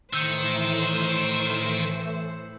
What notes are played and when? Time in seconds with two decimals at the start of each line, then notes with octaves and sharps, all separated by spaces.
0.13 A2 D#3 E3 A3 C5 E6 G6 C#7